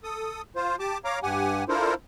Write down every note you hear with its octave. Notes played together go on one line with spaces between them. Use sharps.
A4 D#6
F4 C5
G4 A5 D6
C#5 F5 A#5 D6
G2 G4 F#5 G#5
D4 E4 F4 A4 A#4 C5